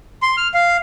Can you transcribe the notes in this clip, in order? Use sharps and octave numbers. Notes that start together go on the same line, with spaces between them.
C6
F6
F5